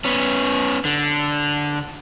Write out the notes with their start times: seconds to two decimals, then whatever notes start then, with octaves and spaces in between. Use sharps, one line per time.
0.05 B3 C#4
0.85 D3